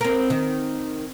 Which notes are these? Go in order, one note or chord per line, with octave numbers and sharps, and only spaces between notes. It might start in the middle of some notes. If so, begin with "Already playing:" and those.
C4 A#4
D#3